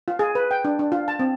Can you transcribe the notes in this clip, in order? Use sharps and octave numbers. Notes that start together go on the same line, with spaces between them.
F4
G#4
B4
G5
D4
D4
F4
A5
C4